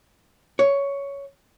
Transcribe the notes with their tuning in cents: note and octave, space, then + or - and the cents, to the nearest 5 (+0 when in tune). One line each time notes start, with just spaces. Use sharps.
C#5 +10